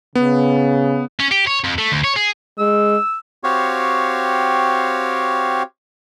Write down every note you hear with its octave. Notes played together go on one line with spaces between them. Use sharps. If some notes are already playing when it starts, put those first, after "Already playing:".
C#3 B3
C#4
G4
C#5
F2
A3
D2
C#5
G#4
G#3 E6
C4 F#4 G4 C#5 F5